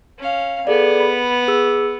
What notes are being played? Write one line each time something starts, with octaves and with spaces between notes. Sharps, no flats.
C#4 F5
B3 G#4 A4 D5
B5
G#4 E6